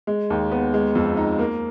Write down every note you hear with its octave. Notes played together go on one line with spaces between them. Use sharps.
G#3
D#2
B3
G#3
F2
D#4
A#3